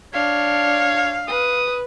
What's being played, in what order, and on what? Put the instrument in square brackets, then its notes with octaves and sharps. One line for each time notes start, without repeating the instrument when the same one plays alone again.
[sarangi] D4 [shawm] C#5 [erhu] F5
[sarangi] B4 [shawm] D#6